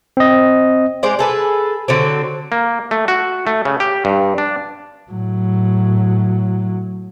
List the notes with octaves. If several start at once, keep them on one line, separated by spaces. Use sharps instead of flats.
C4 D#5
G#3 C5 D5
G#4 A4 B4
D3 F#3 C4
A#3
A3
F#4
A3
C#3
G4
G2
D4
A2 F#3